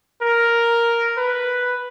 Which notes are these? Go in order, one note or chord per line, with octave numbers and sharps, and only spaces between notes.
A#4
B4